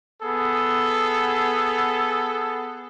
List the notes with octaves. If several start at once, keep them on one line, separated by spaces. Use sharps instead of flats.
B3 G#4 A4